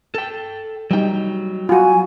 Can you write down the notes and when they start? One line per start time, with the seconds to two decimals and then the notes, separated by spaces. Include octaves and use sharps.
0.15 A4 G5
0.91 F#3 G3 D#4 G5
1.69 F4 F#4 G#5